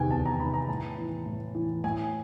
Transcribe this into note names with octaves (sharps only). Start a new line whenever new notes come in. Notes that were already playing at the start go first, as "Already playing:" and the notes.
Already playing: E2 C3 D#3 G5 G#5
E2 A5
A#5
C3 D#3 B5
A#5
A2 A5
E3
A2
E3
A2 G#5